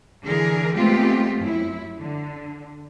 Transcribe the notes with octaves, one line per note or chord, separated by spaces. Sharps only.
D3 E3 G#4 A#4
G#3 A3 B3 C4 F4 G4
F#2 E4
D3